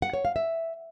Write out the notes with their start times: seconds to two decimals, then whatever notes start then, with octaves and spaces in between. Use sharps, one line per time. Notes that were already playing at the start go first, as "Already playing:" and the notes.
0.02 F#5
0.13 C#5
0.25 F5
0.36 E5